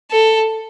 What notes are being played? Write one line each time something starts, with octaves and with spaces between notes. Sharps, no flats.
A4